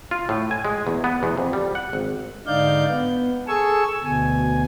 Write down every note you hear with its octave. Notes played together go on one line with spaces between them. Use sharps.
F4
A2
G#5
G#3
E2
B3
E2
F2
G3
F#5
G#1
G#2 D3 D#4 D5 F5 G6
B3
G#4 A4 G#5 C#6 E6
D2 B2 G#5